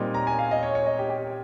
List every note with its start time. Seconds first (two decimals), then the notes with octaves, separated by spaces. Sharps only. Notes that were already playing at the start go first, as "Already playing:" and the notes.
Already playing: A#2 G3 C4 D#4
0.14 A#5
0.27 G#5
0.39 F5
0.51 D#5
0.63 C#5
0.75 C#5
0.86 D#5
0.99 G4
1.10 G4